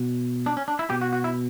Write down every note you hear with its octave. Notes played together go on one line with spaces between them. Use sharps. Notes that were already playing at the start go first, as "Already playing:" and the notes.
Already playing: B2
D4
C#4
D4
E4
B2 G4
F#4
F#4
E4